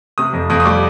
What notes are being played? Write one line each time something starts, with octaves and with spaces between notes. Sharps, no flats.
C3 D#6
F2
F2 D#6
D#6
G3 D6